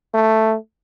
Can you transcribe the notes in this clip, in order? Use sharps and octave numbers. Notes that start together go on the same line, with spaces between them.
A3